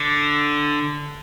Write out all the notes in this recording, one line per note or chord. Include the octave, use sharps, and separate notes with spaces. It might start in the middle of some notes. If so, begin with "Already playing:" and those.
Already playing: D3